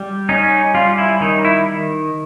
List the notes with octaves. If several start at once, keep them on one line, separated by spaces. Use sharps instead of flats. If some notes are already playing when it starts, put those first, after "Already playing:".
Already playing: G3
C#4 D#4
G3 F4
E4
D#3 D#4
E4